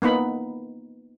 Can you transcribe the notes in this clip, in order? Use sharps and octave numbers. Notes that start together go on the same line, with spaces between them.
A#3 B3 D#4 B5